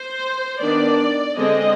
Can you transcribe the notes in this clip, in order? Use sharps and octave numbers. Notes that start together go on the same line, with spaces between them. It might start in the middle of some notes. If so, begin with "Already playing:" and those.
Already playing: C5
D#3 B3 D4 D5
D3 G#3 C4 D#5